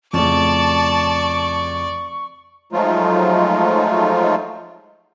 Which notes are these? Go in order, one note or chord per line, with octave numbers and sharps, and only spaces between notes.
F2 A2 C#3 D5 A5 C#6
F3 F#3 G#3 A3 D#4 F4